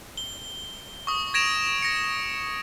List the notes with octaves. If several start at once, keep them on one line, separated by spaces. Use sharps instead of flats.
G7
C#6 D#6
G#6 A#6 D7 E7 F7
A#6 C#7